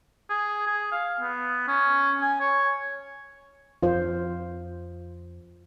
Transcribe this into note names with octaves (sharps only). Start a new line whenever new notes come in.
G#4
G#4
F5
B3
C#4
G#5
C#5
F2 F4 C5